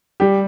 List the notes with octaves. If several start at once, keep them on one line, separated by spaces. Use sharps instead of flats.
G3 G4